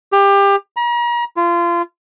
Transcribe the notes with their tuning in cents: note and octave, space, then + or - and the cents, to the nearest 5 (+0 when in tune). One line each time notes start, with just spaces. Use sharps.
G4 +25
A#5 +40
F4 -25